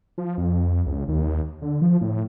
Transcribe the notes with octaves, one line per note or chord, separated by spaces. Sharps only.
F3
F2
C#2
D#2
D3
F3
A2